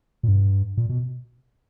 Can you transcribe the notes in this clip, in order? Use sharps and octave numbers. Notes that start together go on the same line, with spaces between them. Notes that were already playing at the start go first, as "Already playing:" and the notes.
A#2
G2
A#2
B2